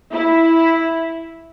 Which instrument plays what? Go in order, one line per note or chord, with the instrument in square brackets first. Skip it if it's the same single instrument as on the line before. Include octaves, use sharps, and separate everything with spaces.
[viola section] E4